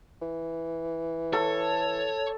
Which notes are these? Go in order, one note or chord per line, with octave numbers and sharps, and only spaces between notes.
E3
A4 C#5